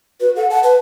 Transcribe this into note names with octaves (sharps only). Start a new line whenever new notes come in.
F#4 B4
A4 F#5
F#5 A5
B4